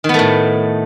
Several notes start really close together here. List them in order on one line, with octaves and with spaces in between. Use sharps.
D#3 B3 A3 A2